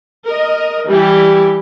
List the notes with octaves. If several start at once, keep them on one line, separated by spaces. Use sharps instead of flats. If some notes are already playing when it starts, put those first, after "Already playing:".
A#4 D#5
E3 G3 E4 G4